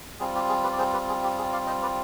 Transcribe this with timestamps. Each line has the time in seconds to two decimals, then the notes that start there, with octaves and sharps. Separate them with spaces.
0.20 G3 C4 F4 G#4
0.35 G4
0.49 G#4
0.64 G4 B4
0.72 D5
0.78 G#4 C5
0.93 G4 B4
1.08 G#4
1.23 G4
1.38 G#4
1.53 D5 F5
1.67 C5 D#5
1.82 B4 D5